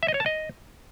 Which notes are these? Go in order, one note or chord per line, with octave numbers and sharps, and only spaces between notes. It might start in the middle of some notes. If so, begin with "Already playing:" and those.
E5
D#5
C#5
A5
D#5